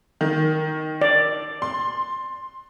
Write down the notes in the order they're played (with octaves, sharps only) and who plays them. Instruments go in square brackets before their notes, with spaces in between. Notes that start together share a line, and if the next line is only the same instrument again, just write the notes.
[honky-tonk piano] D#3
[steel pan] D5
[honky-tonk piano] C6